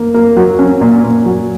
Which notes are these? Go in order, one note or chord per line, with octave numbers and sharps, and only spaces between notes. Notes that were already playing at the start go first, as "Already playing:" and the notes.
Already playing: A#3
A#3
F#3
C#4
A#2
A#2
F#3